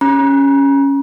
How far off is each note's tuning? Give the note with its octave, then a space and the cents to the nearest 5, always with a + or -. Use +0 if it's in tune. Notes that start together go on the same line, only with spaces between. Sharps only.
C#4 +0 A#5 +40